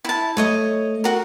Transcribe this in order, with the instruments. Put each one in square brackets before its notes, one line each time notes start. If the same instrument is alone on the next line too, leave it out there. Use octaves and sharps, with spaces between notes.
[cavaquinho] E4 A5
[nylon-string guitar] A3 [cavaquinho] C#5 D#5 D#6
[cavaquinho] F#4 A#4